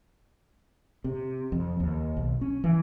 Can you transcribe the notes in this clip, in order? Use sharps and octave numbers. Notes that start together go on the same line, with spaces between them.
C3
F2
D#2
B1
C#4
E3